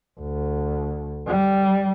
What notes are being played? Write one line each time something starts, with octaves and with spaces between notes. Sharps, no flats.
D2
G3